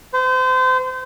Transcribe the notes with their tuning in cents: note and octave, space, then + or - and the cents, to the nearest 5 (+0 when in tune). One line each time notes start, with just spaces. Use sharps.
C5 -35